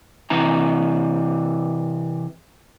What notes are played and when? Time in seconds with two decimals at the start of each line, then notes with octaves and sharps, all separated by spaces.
0.30 C3 E3 A#5